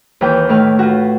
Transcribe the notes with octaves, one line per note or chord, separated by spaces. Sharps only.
D#2 E3 B4 G5
A2 D#3 B4 F6
F4 F#4